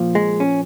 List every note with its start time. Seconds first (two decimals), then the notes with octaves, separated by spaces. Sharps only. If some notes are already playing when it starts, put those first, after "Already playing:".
Already playing: A#2 F3
0.15 G#3
0.40 C#4